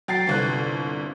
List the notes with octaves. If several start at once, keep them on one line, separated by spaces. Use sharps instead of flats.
F#3 G5 A6 C7
G1 C2 F#6